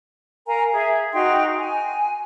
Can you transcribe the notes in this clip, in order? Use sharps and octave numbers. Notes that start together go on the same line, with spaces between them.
A#4 F5 G#5 A#5
G#4 E5
D#4 F#4 G5 C6
G#5